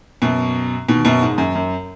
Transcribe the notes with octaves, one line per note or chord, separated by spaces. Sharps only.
F#2 B2
B2 D#3
F#2 B2
G#2
F#2
F#2